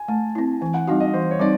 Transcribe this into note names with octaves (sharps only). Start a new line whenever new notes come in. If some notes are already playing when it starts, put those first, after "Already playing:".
Already playing: G#5
A3 A5
C4 E4
E3 G#5
F#5
G3 C4 D#4 F#4 F5
D#5
E3 C5
C#5
G3 C4 D#4 D5